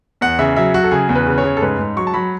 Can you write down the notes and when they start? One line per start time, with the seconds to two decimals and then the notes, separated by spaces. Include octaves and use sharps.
0.21 E2 F#5
0.39 C#3 E5
0.56 F#3 E5
0.74 F#3 F#4
0.84 A4
0.91 C#3 G#4
1.09 E2
1.15 B4
1.27 C#3
1.38 C#5
1.44 C#3
1.57 A4
1.62 G#2 B4
1.79 G#2
1.97 F#3 C#6
2.07 A5
2.14 F#3 B5